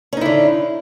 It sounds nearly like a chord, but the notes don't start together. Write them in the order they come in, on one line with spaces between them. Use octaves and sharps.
C#4 D#4 E4 D3